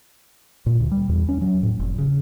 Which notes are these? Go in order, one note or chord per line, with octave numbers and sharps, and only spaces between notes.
A#2
D2
G3
E2
C#4
F#3
A2
F1
C#3